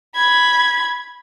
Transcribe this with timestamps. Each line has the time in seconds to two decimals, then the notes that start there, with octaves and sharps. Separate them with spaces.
0.16 B5 G#6